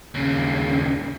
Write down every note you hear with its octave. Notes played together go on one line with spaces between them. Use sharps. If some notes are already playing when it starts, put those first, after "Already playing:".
D#2 C#3